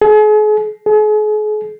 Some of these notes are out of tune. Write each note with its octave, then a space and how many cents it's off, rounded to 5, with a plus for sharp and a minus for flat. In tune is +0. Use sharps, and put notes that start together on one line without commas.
G#4 +40
G#4 +40